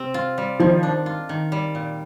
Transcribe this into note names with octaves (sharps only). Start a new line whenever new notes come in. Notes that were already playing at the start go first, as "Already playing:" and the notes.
Already playing: C3 C4
F4
G3
D#3 F3
D4
F4
D#3
G3
A#2